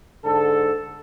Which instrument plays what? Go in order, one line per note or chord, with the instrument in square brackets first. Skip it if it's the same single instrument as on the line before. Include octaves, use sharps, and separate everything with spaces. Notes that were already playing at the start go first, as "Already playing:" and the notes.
[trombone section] G#2 D3 A4